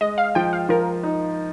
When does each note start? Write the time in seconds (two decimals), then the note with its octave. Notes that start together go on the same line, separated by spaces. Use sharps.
0.01 G#3 D#5
0.18 F5
0.35 F3 G5
0.53 F5
0.69 F3 A#4
1.03 D#4